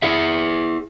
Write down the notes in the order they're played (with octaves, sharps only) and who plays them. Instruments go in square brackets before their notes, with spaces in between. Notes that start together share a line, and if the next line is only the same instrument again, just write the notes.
[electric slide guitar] E4 G#4 E5